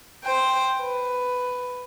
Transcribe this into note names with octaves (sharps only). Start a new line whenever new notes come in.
C5 G5
B4